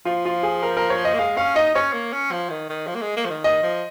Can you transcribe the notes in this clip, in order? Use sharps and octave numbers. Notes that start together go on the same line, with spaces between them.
F3 F4
F4
G#4
A#4
A#4
C#5
D#5
A#3
G#3 F5
C#4 F5
D#4 D#5
C#4 C#5
A#3
C#4
F3
D#3
D#3
F3
A#3
G#3
A#3
F3
D#3
D#3 D#5
F3